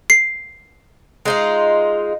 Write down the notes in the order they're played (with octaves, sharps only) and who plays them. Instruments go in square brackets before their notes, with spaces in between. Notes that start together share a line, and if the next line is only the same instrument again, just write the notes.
[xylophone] C7
[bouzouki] G#3 D#4 F4